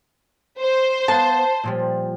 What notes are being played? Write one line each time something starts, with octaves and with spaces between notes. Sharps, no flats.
C5
B3 F5 A5
A#2 F3 G3